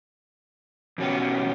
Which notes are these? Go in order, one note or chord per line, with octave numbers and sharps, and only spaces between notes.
E2 B2 F#3 C#4 G4